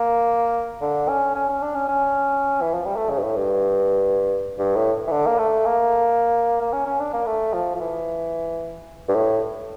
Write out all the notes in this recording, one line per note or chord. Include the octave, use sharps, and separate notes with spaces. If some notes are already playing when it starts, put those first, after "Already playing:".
Already playing: A#3
D3
C#4
C#4
C#4
D4
C#4
C#4
E3
F3
G3
A3
C#3
G2
A2
G2
G2
A2
E3
D3
A#3
A3
A#3
A#3
C#4
C#4
D4
A#3
A3
F3
F3
E3
G2
A2